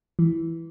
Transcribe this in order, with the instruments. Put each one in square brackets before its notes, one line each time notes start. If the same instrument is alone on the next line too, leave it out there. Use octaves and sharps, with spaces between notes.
[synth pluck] E3